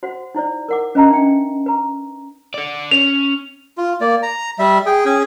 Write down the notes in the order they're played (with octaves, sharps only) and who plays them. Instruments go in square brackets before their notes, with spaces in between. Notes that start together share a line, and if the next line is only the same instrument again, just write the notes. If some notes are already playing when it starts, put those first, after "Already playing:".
[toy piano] F#4 C5 F#5
D#4 E4 C5 D5
A#4 F#5 D6
C#4 B4 D#5 F5 A5 A#5
D4 E5 G5
B4 A#5
[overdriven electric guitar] A4 D5
[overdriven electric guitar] C#4 [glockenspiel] F7
[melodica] F4
A#3 D5
A#5
G3 E5
G#4 G5
C#4 G#4 G#5